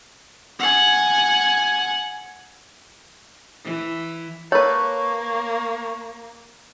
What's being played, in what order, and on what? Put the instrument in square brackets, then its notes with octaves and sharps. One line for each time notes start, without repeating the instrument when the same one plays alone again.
[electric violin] F#5 G#5
[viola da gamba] E3
[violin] A#3 [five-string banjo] A4 B4 [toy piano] C#5 [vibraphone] C#6